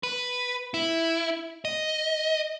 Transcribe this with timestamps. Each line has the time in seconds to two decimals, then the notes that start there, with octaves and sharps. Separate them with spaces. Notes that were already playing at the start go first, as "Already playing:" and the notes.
0.03 B4
0.74 E4
1.65 D#5